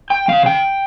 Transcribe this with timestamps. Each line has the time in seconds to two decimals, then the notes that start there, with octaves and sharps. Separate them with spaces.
0.10 G5
0.28 C#3 G3 F5
0.46 G5